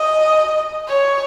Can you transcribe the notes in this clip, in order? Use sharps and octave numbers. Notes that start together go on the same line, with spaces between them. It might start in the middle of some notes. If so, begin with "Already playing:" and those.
Already playing: D#5
C#5